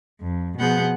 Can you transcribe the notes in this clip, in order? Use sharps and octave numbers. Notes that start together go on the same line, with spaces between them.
F2
B2 F3 B3 G#4 F#5 G6